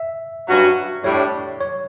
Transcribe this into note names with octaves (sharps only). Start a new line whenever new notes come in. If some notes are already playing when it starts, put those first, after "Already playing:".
Already playing: E5
G2 F#3 C#4 F#4
A2 G3 D4 C#5
C#5